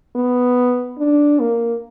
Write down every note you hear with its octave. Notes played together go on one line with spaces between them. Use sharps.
B3
D4
A#3